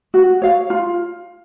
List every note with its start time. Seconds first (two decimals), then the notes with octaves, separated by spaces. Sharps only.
0.14 F#4
0.42 C#5 F5
0.70 F4